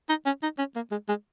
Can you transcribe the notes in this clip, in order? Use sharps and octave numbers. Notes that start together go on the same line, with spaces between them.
D#4
C#4
D#4
C#4
A#3
G#3
G#3